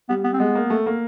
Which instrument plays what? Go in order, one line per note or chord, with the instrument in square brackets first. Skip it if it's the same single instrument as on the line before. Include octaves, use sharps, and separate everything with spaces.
[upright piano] G3 [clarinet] B3
[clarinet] B3
C4
[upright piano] G#3 [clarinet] B3
[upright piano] A#3
A3
A#3